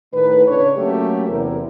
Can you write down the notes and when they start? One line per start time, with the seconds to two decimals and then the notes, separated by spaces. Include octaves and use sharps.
0.13 A2 D#3 A3 B4
0.47 C#3 D4 C#5
0.78 F#3 A3 A#3 C#4 G4
1.29 E2 C3 E4 A#4